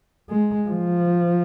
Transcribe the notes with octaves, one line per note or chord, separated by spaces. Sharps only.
G#3
F3